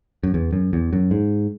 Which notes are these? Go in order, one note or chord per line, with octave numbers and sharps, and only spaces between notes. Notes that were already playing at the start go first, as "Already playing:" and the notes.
F#2
E2
F#2
E2
F#2
G#2